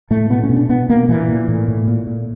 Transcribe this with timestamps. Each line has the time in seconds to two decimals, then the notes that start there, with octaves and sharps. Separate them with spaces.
0.10 A2 A3
0.30 B2 B3
0.43 C#4
0.49 B2
0.56 D4
0.69 B2 B3
0.89 B2 A#3
1.09 A#2 E3
1.28 A#2
1.48 A2
1.68 A2
1.88 A#2
2.07 A#2